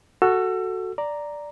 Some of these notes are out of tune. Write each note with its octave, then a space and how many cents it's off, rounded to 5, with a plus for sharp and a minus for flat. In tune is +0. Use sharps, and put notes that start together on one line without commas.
F#4 +0 A4 +0 E6 +30
D5 +0 A#5 +0